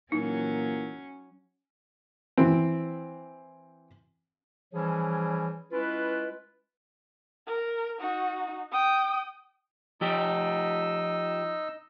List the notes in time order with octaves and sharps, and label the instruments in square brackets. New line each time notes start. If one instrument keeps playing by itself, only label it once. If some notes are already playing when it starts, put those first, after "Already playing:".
[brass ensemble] A#2 E3 A#3 [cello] F#3 C#4 [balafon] D#4
[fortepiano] E3 C4
[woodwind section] E3 F3 G3 C#4 G#4 C#5
G#3 C#4 E4 F4 B4
[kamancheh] A#4
D#4 F#4
G5 D#6
[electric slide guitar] F3 G4 [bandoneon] D#4 D#5 E6